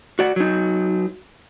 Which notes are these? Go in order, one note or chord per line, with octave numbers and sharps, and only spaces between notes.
F#4 D5 F#5
F#3 D#4